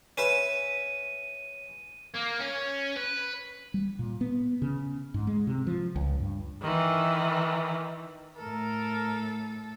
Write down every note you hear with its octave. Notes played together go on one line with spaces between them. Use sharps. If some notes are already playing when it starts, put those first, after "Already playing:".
C#4 B4 E5 D#7
A#3
C#4
B4
G3
A#2
B3
C#3
G#2
G#3
C3
F3
C#2
G2
D#3 E3
A2 A4 A#4